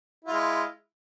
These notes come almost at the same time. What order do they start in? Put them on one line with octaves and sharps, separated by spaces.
E4 F4 G#3